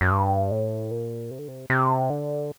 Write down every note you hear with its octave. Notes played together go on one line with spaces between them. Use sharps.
F#2
G2
A2
A#2
C3
D3
C3
C3
D3